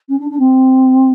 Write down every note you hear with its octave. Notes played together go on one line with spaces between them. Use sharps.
C#4
D4
D4
C4